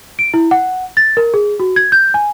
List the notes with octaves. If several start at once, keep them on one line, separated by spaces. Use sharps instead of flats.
D7
E4
F#5
A6
A#4
G#4
F#4
G#6
G6
G#5